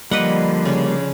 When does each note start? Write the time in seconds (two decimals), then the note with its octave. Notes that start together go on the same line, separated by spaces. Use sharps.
0.11 D3 F3 G3 A#3 B4 D#5 F#5
0.65 C#3